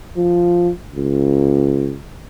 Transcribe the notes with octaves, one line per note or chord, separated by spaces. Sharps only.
F3
C#2